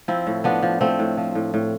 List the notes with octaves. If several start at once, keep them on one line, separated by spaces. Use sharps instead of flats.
F3 C4 E4
A2
F3 B3 D4
F3
F3 A3 C4
A2
F3
A2
A2